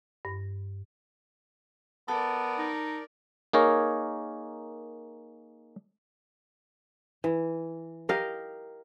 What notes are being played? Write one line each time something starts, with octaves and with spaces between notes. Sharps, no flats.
G2
B3 A4 A#4 D5
D#4
A#3 D#4 G#4 A#4 C#5
E3
G4 A#4 D#5 F5